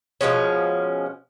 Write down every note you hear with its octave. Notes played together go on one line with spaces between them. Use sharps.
B2 F3 G#3 C#4